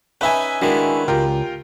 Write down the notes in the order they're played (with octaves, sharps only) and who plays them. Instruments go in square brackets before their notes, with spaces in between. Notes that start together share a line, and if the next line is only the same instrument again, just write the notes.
[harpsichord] C#4 D#4 [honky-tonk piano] B4 E5 G#5
[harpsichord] D#3 G#3 [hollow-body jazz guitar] D4 E4 F#4
[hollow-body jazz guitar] C#2 [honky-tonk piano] F4 G4 A#4